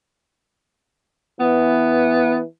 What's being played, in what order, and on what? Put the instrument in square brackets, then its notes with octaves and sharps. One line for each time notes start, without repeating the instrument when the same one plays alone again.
[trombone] E3 [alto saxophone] B3